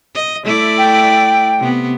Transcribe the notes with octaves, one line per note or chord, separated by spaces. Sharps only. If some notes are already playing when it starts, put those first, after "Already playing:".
D#5
A3 E4 D5
G5
C3 B3